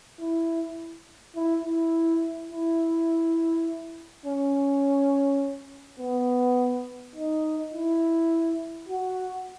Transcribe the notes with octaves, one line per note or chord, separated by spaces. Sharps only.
E4
E4
E4
E4
C#4
B3
D#4
E4
F#4